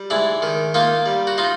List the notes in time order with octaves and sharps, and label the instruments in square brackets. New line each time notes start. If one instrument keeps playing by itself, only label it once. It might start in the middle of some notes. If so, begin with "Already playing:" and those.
Already playing: [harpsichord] G3
G#2 D4 E4
D#3
A#3 D#4 F4
G3
F#4
D#4 F4